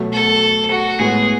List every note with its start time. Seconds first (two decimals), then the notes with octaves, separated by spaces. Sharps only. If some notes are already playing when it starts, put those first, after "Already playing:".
Already playing: B2 F#3 A3
0.13 A4
0.71 F#4
0.99 A2 G#3 B3 G#4